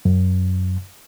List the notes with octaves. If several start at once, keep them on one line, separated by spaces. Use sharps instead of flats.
F#2